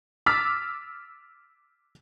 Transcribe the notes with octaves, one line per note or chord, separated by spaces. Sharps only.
D6 E6 F6 A6 B6